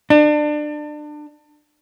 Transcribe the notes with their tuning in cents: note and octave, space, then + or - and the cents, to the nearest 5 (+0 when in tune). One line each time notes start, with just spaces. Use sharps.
D4 +30